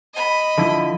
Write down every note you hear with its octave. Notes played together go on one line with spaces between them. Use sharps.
D#5 B5
D3 F3 E4